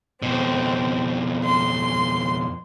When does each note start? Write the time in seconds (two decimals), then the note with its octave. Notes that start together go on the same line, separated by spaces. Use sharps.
0.22 F2 B2 C4
1.45 C6